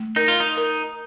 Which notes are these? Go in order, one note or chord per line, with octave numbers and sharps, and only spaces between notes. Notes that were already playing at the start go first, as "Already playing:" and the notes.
Already playing: A3
D#4 A#4
F4
D#4
A#4